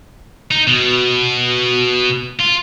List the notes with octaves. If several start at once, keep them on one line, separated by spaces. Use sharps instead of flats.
D#4
B2
F4